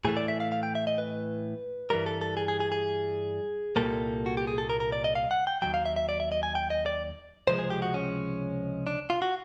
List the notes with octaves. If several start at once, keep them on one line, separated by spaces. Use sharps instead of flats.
A2 E3 A3 G#4
D5
E5
F5
F5
G5
E5
D#5
B4
G2 E3 G3 A#4
A4
A4
G#4
G#4
G#4
G#4
C2 A#2 G3 A#3 A4
F#4
G4
G#4
A4
A#4
A#4
D5
D#5
F5
F#5
G5
D#2 D#3 F#3 G5
F5
E5
E5
D5
E5
D#5
G#5
G5
D#5
D5
C#2 C3 F3 G#3 C5
G#4
G4
F#4
C#4
D4
F4
F#4